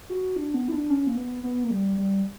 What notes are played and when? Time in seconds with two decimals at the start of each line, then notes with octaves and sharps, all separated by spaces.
0.10 F#4
0.36 D4
0.54 B3
0.68 E4
0.72 D4
0.90 C#4
1.07 A#3
1.16 B3
1.44 B3
1.64 A#3
1.70 G3
1.98 G3